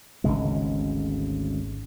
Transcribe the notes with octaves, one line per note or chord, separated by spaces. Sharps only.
G#1 D2 C#3 G#3